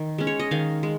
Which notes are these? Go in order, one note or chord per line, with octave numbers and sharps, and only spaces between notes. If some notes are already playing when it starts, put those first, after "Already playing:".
Already playing: D#3
G#3 C#4
C#5
D#5
D#3 F5
G#3